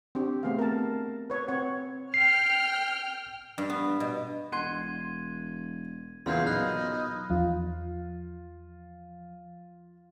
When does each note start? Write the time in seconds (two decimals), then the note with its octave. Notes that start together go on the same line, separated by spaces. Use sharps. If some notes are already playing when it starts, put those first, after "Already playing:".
0.15 C4 D4 G4
0.43 A3 B3 C4 G#4 F5
0.59 A#4 A5
1.30 B4 C#5
1.48 C4 C#5 F#5
2.14 G5 F6 C7
3.58 G2
3.70 B3
4.00 B2
4.52 E1 F#5 C6 G#6 D#7
6.26 E2 A#2 C#3 F5 C6 F6 G6
6.46 B1 D#4 B5 F6 F#6
7.30 E2 F3 F4 F5